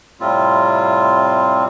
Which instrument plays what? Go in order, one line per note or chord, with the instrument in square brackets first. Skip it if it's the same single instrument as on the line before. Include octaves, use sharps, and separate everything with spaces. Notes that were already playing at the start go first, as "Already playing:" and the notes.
[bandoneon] A2 C3 G3 C4 F4